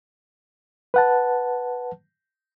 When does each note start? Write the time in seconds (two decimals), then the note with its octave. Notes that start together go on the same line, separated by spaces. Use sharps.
0.94 B4 F#5 A5